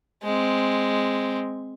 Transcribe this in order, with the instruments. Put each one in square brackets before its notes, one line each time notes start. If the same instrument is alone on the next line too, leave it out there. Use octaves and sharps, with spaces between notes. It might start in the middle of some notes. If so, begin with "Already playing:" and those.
[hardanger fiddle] G#3 C4